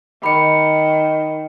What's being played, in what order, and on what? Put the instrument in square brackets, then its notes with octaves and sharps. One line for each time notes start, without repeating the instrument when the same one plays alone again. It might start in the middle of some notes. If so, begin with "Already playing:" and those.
[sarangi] D#3 [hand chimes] B5 C#7